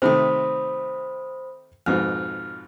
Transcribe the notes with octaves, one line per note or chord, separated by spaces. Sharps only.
C3 D#3 A3 C5 B5 D#6
F2 G#2 B2 F6